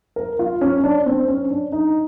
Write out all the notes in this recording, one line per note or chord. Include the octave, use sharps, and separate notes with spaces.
A#4
F4
C#4
D4
C4
C#4
D4
D#4